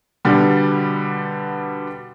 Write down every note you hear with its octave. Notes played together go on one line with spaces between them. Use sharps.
B2 D3 G3